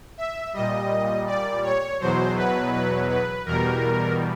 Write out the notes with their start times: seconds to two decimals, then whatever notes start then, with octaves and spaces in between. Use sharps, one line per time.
0.17 E5
0.54 A#2 G3 D#5
1.27 D5
1.63 C#5
2.00 E2 B2 F#3 C5
2.36 B4
2.73 B4
3.09 B4
3.46 E2 B2 G3 A#4